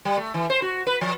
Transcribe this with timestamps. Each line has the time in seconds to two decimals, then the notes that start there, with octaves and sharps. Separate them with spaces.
0.05 G3
0.17 A3
0.34 E3
0.50 C5
0.62 F#4
0.87 B4
1.01 F3